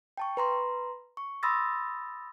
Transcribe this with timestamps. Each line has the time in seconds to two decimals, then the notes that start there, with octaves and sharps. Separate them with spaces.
0.17 G5 A5 C#6
0.37 B4 A#5 C6
1.17 C#6
1.43 B5 C6 D#6 E6 A6 A#6